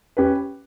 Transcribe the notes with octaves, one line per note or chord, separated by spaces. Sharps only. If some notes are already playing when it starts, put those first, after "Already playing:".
C#4 G4 B4